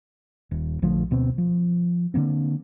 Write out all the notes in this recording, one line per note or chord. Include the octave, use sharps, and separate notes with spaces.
D#1
A#1 D3 F3 A3
D2 B2 C4
F3
D3 E3 A#3 C4